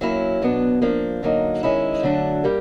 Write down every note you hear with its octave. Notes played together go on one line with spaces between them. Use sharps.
F#3 A#3 C#4 E4
B2 F#3 B3 D4
F3 A#3 D4
D3 F#3 A#3 D#4
D#3 G#3 C#4 E4
D3 F#3 A3 D4
G3 A#3